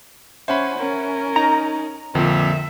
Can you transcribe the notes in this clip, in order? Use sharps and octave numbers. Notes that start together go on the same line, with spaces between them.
C#4 C5 E5 F#5 B5
C#4 A#4
D#4 A#5
F2 A#2 D3 E5